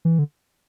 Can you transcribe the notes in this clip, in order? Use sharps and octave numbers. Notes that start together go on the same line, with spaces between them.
E3
D3